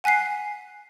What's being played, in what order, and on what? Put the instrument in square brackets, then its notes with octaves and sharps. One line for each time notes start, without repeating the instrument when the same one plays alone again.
[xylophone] F#5 G#5 F#6 B6 C7